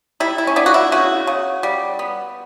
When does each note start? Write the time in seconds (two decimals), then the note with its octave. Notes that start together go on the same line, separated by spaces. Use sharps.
0.20 G3 E4
0.38 E4
0.47 C#4
0.56 B3 D4
0.66 F#4
0.74 E4
0.92 C#3 F#4
1.27 C#3
1.63 G3
1.99 B3